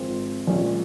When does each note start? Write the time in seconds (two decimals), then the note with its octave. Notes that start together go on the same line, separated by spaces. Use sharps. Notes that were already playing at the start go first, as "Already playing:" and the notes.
Already playing: G#1 G#2 F3 G#3 C4
0.47 A#1 A#2 G#3 C#4